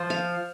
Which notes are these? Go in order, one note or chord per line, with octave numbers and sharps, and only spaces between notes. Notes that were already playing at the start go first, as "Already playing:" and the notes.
Already playing: F3 C5
F5